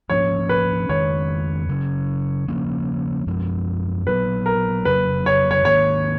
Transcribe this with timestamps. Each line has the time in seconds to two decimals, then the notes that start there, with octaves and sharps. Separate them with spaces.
0.10 G#2 F3 A#3 C#4 C#5
0.49 B4
0.89 F2 D#3 G#3 C#5
1.69 C#3 F#3 C#4
2.48 C#3 F3 A#3 C#4
3.27 F#2 F3 G#3
4.07 A#2 F#3 B3 B4
4.46 A#4
4.85 F2 C#3 F#3 B4
5.26 C#5
5.51 C#5
5.65 G#2 D#3 A#3 C#5